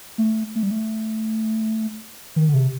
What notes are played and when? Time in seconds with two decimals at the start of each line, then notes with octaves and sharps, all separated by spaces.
0.18 A3
0.55 A3
0.63 G3
0.71 A3
2.36 D#3
2.49 D3
2.54 C3